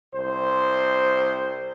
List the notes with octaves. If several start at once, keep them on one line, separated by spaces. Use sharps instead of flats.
C2 C5